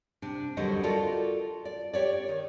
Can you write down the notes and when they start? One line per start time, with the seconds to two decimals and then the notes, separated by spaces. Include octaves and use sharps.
0.22 C3 D4
0.57 D#2 D3 F#3 G3 C5 D#5
0.83 F4 F#4 A4 A#4 D5
1.65 D5
1.93 G4 C#5 D5
2.29 D#3